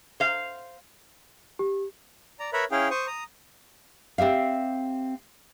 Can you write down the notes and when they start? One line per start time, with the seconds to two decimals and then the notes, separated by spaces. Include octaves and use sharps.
0.20 C5 F5
1.59 G4
2.40 D5 A#5
2.53 A#4 B4 C#5 E5 A#5 B5
2.71 C#4 E4 G#4 F5 G5
2.91 C5 C#6 D#6
3.07 A#5 D#6
4.18 C4 G4 E5 F5